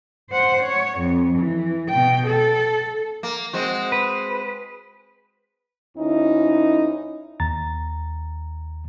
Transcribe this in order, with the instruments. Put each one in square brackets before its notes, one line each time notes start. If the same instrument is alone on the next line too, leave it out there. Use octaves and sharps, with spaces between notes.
[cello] C5 F#5
C#5
F2
E3
B2 G5
A4
[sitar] A#3
G#3 C4 F#4
[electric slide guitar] B4
[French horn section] D2 C#4 D#4 E4
[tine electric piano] D#2 A#5 A6